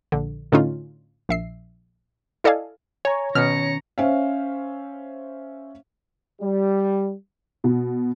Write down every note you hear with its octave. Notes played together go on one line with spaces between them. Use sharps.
A#1 D3
A2 D3 C#4 D#4 F4
A#1 E5 C7
E4 A4 D5 D#5 F5 G#5
C#5 G#5 A#5
B2 D#3 C#4 A#5 F6 C#7
C#4 C5 E5 F5
G3
B2